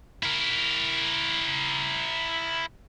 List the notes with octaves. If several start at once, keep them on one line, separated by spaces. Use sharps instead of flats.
E4 A#4